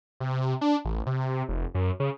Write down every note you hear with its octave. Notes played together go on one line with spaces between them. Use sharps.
C3
D4
A1
C3
F1
F#2
C#3